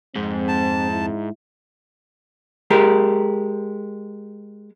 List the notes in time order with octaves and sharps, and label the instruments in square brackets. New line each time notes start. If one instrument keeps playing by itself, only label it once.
[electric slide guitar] F2 [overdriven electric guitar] G#2 [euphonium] C4
[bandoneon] A5
[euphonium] E4
[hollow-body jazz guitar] G#3 G4 A#4